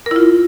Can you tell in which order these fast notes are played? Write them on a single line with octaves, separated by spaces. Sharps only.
A#4 E4 F4